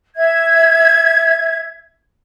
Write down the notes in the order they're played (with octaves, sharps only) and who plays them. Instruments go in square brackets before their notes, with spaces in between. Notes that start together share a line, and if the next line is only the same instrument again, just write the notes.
[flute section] E5 G#6